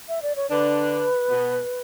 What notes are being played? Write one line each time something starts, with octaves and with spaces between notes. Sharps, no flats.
E5
D5
C#5
D3 D4 B4
B2 B3